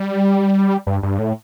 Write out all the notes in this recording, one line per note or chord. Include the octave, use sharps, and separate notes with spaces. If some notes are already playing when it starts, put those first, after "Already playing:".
Already playing: G3
G2
G2
A2